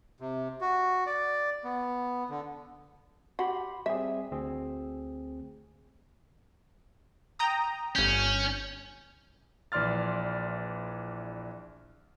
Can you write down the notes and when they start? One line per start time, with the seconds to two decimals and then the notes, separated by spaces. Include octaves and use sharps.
0.20 C3
0.61 F#4
1.07 D5
1.64 B3
2.29 D3
3.39 F#4 G4 B5 C6
3.86 G3 C4 G#4 E5
4.32 D2 C4 G#4
7.39 G5 A#5 D#6
7.96 G1 C#4 G6
9.72 A#1 E3 D5 C6 F6 A6